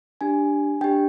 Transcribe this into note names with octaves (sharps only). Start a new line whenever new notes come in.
D4 G4 G#5
D4 G4 G5